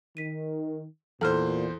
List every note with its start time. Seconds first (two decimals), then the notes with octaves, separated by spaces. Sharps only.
0.17 D#3 B6 D#7
1.21 E2 A#2 A4 C5 F6